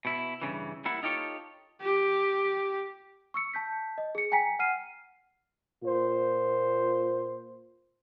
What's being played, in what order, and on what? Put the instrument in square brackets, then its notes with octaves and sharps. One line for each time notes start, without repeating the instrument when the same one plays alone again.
[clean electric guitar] B2 E4
G2 C#3 E3
G3 A#3 E4 F#5
D#4 F4 G4 A4 C#5
[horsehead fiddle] G4
[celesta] C#6 E6 C#7
A5 G6 B6
D#5
G#4 C#7
G5 G#5 A#5 B6 C#7
F#5 F6 C7 D#7
[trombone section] A#2 F4 C5